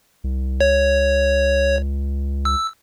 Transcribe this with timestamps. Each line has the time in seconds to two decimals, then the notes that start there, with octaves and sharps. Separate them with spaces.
0.24 C2
0.61 C#2 C#5
2.45 E6